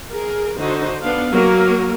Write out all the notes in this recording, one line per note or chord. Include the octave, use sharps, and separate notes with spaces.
G#4 A#4
D3 D#4 F#4 C5
B3 D4 F5
F#3 A#3 A#4